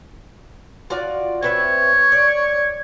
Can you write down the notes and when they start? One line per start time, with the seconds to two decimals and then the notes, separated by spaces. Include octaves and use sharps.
0.90 F4 F#4 D5
1.42 C4 B4 C#5 E5
2.12 D5